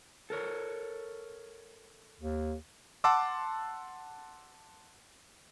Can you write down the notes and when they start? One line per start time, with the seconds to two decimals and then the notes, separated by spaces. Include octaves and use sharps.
0.30 A4 A#4 C#5
2.21 D#2
3.04 F#5 A5 C6 D6 E6